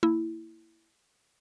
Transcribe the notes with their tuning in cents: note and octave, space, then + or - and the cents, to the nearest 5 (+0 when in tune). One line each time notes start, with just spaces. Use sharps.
A#3 -30 E4 +0